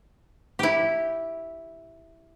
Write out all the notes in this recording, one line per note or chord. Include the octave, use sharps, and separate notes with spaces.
E4 G4